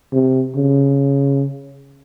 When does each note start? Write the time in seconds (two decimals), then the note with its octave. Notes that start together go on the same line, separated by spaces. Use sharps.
0.13 C3
0.56 C#3